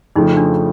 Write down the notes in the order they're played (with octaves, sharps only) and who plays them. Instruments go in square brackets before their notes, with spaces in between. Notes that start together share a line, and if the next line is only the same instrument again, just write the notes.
[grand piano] F2 C#3 F3 A3 [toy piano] D#4
[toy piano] D4